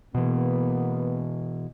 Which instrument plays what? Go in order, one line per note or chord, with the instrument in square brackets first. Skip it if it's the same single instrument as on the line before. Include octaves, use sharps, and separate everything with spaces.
[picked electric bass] B2 E3 [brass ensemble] A#3 B3